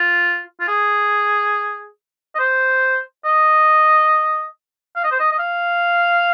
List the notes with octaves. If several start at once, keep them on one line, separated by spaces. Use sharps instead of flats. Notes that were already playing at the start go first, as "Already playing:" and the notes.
Already playing: F4
F4
G#4
D#5
C5
D#5
F5
D#5
C5
D#5
D#5
F5